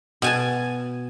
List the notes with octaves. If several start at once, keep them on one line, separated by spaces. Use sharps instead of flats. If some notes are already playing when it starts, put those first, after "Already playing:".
B2 G#5 A5